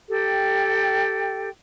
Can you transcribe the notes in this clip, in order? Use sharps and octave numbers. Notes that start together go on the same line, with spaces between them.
G4 A4 G5